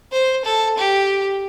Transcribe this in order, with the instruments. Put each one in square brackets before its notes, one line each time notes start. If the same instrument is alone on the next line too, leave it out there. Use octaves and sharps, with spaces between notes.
[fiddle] C5
A4
G4